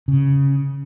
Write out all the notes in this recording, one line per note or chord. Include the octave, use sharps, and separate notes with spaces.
C#3